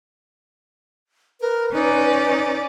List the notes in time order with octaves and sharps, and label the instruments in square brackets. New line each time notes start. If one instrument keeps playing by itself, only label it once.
[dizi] A#4 [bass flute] B4
[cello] C#4 D5 [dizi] D#4